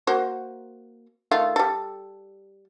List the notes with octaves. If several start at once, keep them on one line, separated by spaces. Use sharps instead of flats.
A#3 F#4 C5
D#3 A3 F4
G3 A4